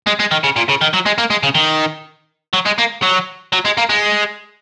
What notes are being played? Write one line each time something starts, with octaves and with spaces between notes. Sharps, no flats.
G#3
G#3
D#3
C#3
A#2
C#3
D#3
F#3
G#3
A#3
G#3
C#3
D#3
F#3
G#3
A#3
F#3
F#3
G#3
A#3
G#3